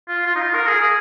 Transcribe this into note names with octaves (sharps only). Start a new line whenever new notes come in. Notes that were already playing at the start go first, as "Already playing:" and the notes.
F4
F4
D#4
F4
A#4
G#4
G#4